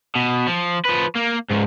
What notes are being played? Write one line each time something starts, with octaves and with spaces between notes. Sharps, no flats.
B2
F3
F3 B4
A#3
C#2 G#2